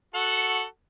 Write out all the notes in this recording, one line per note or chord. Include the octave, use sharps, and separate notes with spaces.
F#4 A4 F#5